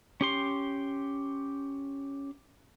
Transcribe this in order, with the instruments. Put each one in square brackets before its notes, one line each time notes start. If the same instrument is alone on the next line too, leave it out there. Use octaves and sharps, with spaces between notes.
[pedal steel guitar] C#4 G4 C6